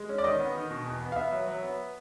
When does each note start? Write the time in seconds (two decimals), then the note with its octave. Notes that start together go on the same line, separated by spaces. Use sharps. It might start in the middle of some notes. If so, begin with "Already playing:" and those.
Already playing: G#3
0.09 C#4
0.18 D5
0.24 D#3 D#5
0.40 B3
0.55 D#3
0.71 B2
0.85 E2
1.01 B3
1.12 F5
1.16 B3 E5
1.32 F#3
1.47 F#3
1.63 B3